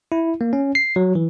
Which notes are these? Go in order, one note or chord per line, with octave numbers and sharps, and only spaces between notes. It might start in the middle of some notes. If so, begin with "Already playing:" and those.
E4
A#3
C#4
C7
F#3
E3